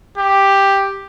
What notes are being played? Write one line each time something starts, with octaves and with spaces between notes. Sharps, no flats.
G4